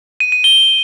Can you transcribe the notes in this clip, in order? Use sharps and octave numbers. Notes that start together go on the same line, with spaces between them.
D#7
D#7
G7